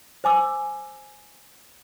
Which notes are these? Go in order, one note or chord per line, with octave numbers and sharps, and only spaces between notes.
C5 G#5 D6 E6